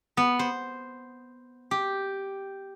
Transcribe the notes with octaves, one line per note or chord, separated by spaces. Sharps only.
B3
C5
G4